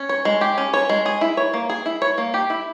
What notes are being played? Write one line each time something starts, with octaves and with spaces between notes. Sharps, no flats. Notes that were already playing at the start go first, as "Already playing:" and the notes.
Already playing: C#4
C#5
G#3
G4
C#4
C#5
G#3
G#4
E4
C#5
A#3
G#4
E4
C#5
A#3
G4
E4